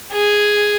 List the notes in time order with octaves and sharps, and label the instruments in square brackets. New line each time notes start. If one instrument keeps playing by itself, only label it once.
[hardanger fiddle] G#4